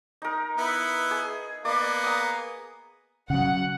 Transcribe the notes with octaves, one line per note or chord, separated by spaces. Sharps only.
D#4 A#4
B3 E4
G#4
A#3 B3 D5
A#5 D#6
C#3 F#3 F#5